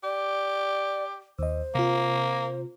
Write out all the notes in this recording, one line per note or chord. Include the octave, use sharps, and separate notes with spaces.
G4 D5
D#2 C5 D#5
C3 A#3 F4